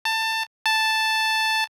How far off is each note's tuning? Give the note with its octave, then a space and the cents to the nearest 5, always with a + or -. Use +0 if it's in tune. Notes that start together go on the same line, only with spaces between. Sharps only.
A5 +20
A5 +0